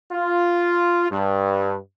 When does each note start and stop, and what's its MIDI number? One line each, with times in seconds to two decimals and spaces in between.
0.12 1.09 65
1.11 1.76 43